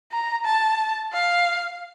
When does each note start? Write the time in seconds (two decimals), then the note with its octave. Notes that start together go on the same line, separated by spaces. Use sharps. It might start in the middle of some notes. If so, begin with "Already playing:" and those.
0.12 A#5
0.45 A5
1.12 F5